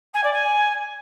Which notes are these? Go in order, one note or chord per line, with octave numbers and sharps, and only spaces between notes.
G#5
D5
G#5